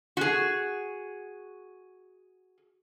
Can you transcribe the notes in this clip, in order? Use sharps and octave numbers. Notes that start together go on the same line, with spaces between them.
F#4 G#4